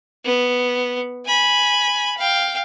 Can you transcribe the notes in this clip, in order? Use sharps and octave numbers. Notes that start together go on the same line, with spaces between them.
B3
G#5 B5
F5 G5